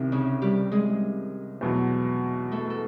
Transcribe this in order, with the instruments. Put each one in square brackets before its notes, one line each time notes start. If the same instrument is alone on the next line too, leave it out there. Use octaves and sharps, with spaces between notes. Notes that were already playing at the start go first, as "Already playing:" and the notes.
Already playing: [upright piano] C2 C3 D#3
[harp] C#3 C#4
G3 G4
G#3 G#4
[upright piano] E2 B2 F#3
[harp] A3 A4
A4